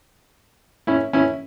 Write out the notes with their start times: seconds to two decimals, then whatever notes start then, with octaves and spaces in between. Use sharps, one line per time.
0.87 C#4 E4
1.13 C#4 E4